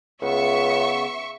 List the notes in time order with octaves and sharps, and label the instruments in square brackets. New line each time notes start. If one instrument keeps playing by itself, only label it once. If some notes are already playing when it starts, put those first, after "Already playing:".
[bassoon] C#2 [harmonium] C#3 B3 [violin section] E5 C#6